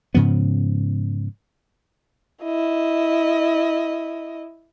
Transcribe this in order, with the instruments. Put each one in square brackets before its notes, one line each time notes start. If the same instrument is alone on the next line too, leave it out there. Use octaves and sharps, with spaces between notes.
[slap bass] G#2 C#3 F3 B3
[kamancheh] E4 D#5